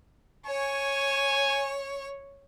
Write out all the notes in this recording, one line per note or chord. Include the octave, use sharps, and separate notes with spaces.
C#5 G#5 C#6